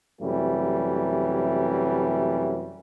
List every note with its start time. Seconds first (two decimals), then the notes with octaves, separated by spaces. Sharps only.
0.22 F#2 C3 E3 G3 A3